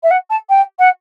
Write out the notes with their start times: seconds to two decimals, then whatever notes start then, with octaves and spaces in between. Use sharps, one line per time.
0.03 E5
0.11 F#5
0.30 A5
0.49 G5
0.79 F#5